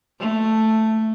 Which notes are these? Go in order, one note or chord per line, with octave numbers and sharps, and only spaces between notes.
A3